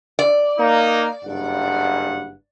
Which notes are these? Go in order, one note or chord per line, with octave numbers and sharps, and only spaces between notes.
D5
A#3 D#4
F#1 G2 F#5